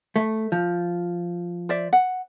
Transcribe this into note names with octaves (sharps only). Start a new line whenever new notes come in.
A3
F3
C5 D5 E5
F#5